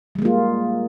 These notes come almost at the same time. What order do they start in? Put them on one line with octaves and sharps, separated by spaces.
G3 G#3 A#3 F4